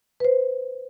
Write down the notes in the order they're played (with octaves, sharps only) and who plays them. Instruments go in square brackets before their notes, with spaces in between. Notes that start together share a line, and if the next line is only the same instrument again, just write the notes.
[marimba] B4 C5